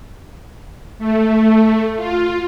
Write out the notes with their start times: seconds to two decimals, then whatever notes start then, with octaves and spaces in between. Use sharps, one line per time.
0.99 A3
1.97 F4